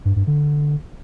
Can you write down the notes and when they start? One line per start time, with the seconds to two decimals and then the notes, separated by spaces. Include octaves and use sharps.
0.05 G2
0.16 G2
0.27 D3